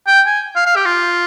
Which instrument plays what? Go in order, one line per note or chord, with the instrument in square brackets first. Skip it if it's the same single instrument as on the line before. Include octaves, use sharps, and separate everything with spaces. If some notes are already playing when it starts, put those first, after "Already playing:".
[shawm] G5
G#5
F5
F5
G4
F4